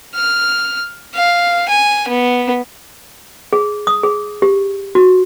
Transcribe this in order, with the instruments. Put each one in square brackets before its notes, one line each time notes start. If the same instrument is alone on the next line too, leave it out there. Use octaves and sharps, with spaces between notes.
[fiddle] F6
F5
G#5
B3
[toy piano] G#4
D#6
G#4
G4
F#4